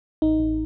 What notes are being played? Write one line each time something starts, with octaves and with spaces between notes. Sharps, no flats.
A1 D#4
A1